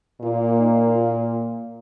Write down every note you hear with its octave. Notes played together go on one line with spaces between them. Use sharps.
A#2 A#3 F4
D#4
F4